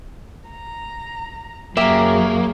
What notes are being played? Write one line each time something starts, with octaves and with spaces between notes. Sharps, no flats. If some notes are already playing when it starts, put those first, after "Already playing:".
A#5
F#2 C#3 A#3 G4 E5 A#5